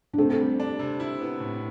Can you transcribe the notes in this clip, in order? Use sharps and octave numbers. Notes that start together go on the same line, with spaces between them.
D4
C3 A3 C4
G3
D4
C3
E4
B3
A2